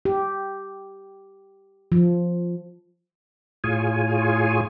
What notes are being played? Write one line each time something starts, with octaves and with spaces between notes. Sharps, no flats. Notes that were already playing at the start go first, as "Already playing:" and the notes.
G4
F3
A2 F4 G#4 C#5 G#5